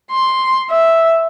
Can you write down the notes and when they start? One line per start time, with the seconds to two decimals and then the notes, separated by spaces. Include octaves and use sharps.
0.11 C6
0.70 E5